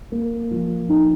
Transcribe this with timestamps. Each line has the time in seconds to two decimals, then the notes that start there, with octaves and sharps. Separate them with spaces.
0.12 A#3
0.51 F3
0.89 D#4